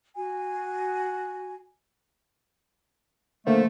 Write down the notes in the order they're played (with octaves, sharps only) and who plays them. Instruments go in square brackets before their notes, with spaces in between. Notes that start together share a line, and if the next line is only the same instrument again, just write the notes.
[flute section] F#4 G#5
[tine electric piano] D3 A#3 C5 [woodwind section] F3 A3